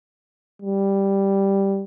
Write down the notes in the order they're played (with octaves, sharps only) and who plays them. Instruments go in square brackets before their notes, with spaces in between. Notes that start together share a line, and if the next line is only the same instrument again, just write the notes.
[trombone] G3